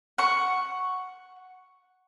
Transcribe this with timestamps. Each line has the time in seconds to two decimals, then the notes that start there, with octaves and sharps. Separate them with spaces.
0.18 F#5 C#6